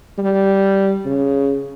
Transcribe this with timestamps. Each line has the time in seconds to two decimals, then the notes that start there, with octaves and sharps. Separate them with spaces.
0.18 G3
1.05 C#3